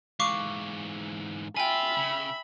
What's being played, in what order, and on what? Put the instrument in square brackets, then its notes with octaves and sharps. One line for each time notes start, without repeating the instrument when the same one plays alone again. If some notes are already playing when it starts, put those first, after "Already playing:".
[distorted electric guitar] G#2 E3 [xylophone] F5 C#6 D6
[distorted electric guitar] F4 [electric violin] E5 B5 [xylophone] G5 G#5
[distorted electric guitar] C#3